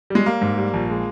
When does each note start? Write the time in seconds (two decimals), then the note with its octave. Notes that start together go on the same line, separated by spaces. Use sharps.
0.10 G3 G#3
0.26 G3 A#3
0.42 G#2
0.58 G3
0.74 A#1
0.90 G#3